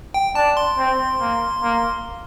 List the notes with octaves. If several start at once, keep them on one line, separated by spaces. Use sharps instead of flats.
G5
D4 A5
C6
C4
A#3
A#3